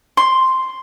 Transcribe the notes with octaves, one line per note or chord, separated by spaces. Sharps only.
C6